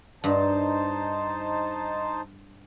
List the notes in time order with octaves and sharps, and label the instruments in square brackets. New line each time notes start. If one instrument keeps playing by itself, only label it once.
[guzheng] G2 [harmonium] D#4 C5 A5